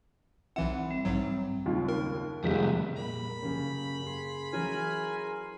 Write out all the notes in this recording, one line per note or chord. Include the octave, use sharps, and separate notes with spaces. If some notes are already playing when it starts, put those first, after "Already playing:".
B1 E3 C4 E4 F#5
G3 C4
B1 G#2 F#3
F#1 D#2 F4
A#4
C2 F2 G#3 G4 B6
A#2 A#3 B5
F#2 C#3 A#3 C#4 G4
G#4 C6
E3 F#3 C#4 A#4 G#5